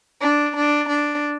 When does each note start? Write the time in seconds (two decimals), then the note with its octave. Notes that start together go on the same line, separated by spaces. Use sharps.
0.22 D4
0.56 D4
0.90 D4